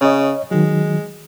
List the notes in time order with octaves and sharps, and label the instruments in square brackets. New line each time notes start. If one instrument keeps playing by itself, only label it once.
[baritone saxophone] C#3 [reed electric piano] C#5 D#5
[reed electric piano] D#3 F#3 [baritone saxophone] G#3